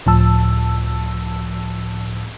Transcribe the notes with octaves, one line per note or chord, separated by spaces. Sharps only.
C#2 A2 F3 A5 E6